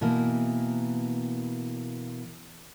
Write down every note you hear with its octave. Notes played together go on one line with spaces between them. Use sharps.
B2 E3 A#3